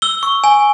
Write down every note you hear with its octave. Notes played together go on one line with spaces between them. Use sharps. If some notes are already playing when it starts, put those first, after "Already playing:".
E6 G7
C#6
G#5